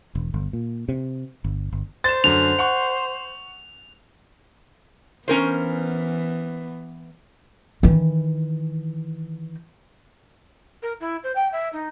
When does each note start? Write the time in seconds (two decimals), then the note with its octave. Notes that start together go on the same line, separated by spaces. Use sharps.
0.15 E1
0.34 G1
0.53 A#2
0.89 C3
1.44 G1
1.72 G1
2.04 C5 A6 E7
2.24 F#2 D3 F7
2.59 F#5 C#6
5.28 E3 B3 C#4 A#4 C5
7.83 D#3 E3
10.83 A#4
11.00 E4
11.24 C5
11.36 G5
11.52 E5
11.73 D#4